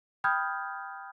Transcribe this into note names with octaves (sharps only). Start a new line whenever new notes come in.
G5 B5 D#6 F6 G6 G#6